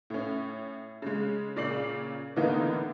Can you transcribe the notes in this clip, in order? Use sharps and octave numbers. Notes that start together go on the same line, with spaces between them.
A2 C#4
C#3 G#3
A#2 C#3 D5 C7 F#7
A2 D3 E3 A#3 B3 D#4